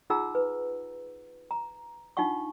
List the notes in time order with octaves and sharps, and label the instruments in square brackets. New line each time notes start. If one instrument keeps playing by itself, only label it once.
[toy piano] D#4 F4 G#4 F#5 A#5 E6
B4
A#5
D4 D#4 F4 F5 F#5 C#6